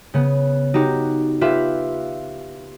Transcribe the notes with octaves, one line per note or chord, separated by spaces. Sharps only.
C#3 B3
D#4 F#4 G4
F4 G4 B4 E5 F5